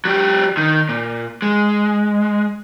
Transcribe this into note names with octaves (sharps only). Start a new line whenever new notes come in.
F#3 G4
D#3
A#2
G#3